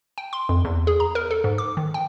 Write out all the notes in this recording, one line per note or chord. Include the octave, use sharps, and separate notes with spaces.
G5
C6
F2
E2
G#4
A#5
A#4
A4
G#2
D6
D#3
G5